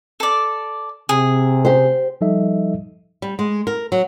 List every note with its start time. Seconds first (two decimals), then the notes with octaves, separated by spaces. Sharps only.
0.20 A4 D5
1.09 C3 G#4
1.65 G4 C5
2.21 F3 G3 D#4 A4 D#5 E5
3.22 G3
3.39 G#3
3.67 A#4
3.92 F#3